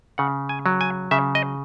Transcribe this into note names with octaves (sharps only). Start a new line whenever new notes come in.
C#3 F#5
G#5
F#3
G#5
C#3 E5
D#5